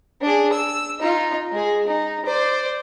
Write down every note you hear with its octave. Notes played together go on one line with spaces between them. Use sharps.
D4 G#4
E6
D#4 F4
G#3 G#4
D#4
C5 D5